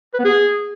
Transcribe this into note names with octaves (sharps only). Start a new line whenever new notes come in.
B4
B3
G#4